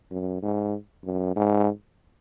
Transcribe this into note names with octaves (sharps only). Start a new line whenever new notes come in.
F#2
G#2
F#2
G#2